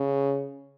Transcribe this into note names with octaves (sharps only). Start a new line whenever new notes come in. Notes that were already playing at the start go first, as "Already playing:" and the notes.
Already playing: C#3